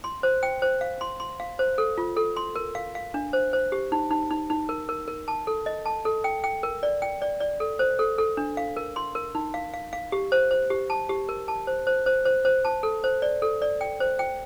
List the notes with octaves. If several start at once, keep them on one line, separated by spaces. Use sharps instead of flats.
C6
C5
G5
C5
F5
C6
C6
F5
C5
A4
F4
A4
C6
A#4
F5
F5
D4
C5
C5
G4
D#4
D#4
D#4
D#4
A#4
A#4
A#4
A5
A4
D#5
A5
A4
G5
G5
A#4
D5
G5
D5
D5
A4
C5
A4
A4
D4
F5
A#4
C6
A#4
D#4
F5
F5
F5
G4
C5
C5
G4
A5
G4
A#4
A5
C5
C5
C5
C5
C5
A5
A4
C5
D5
A4
D5
G5
C5
G5